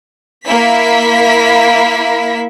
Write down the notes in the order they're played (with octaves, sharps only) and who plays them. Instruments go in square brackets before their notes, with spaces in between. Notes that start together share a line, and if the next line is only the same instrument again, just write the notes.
[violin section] A#3 E4 B6